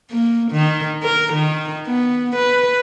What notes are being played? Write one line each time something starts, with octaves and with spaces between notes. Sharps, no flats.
A#3
D#3
A#4
D#3
B3
B4